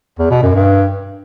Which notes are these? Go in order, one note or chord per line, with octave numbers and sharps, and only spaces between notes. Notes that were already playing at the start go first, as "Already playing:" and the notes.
E2
B2
F#2
G2